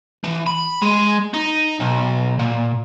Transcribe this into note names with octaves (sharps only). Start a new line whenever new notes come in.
E3
B5
G#3
D#4
B1
A#2